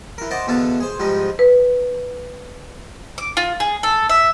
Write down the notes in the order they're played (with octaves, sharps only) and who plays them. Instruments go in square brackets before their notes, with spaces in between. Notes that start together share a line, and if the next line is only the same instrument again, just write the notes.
[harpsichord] E3 A#4
C5 D#5 F#5 A5 D6
E2 B2 D3 A3 F5 A5
G#4 C5
G#2 F3 G3 D#4
[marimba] B4
[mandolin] D6
F4
G#4
A4
E5